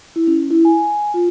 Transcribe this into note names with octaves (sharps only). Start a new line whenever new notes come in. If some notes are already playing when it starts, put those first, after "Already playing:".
E4
C#4
E4
G#5
F4